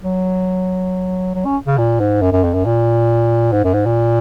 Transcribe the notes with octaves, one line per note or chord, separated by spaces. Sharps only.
F#3
F#3
C#4
C#3
A#2
G#2
F#2
F#2
F2
F#2
A#2
G#2
F#2
G#2
A#2